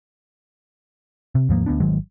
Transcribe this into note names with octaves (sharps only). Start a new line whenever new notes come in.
C3
D#2 G#2 F3 A#3
D2 B3 D4
G#1 D#3 F#3 G#3